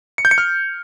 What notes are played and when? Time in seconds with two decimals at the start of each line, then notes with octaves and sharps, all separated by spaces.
0.18 C#7
0.25 G6
0.31 C#7
0.38 F6